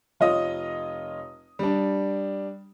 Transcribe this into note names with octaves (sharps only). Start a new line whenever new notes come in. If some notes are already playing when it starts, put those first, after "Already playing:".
F1 F4 C#5 D#5 D#6
G3 D4